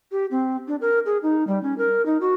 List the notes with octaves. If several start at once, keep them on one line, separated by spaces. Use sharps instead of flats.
G4
C4
D4
A#4
G#4
D#4
G3
C#4
A#4
D#4
F#4